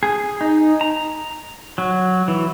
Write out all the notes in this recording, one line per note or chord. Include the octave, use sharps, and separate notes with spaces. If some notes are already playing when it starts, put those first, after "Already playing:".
G#4
D#4
A#5
F#3
E3